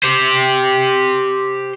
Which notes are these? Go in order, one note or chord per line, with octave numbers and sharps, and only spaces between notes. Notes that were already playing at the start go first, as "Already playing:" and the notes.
G4 C5